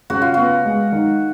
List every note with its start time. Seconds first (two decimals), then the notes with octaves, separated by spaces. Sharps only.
0.10 C#3 F#4
0.22 F4
0.34 B3 F#4
0.65 G#3
0.92 D#3